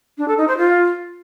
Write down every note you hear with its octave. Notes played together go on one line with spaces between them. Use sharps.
D4
A4
D#4
C5
F4